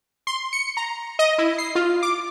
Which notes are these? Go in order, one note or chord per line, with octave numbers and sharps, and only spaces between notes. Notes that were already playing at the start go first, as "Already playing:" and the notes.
C6
C#7
A#5
D#5
E4
C7
F4
D6